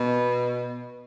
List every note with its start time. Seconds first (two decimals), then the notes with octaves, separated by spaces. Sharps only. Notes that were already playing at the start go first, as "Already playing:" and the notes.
Already playing: B2